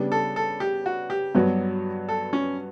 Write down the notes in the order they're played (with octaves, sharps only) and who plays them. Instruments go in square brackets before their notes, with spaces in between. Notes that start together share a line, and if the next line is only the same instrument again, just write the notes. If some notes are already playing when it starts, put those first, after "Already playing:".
Already playing: [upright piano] C#3 G3 B3 D4 G4
[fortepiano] A4
A4
G4
F#4
G4
[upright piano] G2 F#3 B3 F#4
[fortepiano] A4
C#4